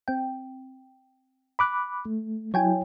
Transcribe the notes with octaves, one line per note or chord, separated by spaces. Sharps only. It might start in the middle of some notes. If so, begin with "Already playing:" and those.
C4 G5
B5 D6 F#6
A3
F#3 E4 C#5 G5 G#5